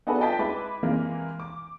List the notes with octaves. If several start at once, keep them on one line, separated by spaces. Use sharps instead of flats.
B3 D4 F#4 G#4 A4 B4
F4 D#5 G5 A5 A6 B6
G#3 E4 B4 B5 D6
C3 E3 G#3 A#3
D6